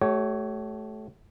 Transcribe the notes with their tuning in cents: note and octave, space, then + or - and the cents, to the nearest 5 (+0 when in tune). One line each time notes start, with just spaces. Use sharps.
A3 -20 G4 -45 C#5 +0